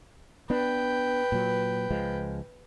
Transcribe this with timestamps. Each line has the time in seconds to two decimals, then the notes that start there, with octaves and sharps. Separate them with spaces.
0.50 B3 D4 B4 G5
1.32 A#2 F#3
1.91 C#2 F3 G#3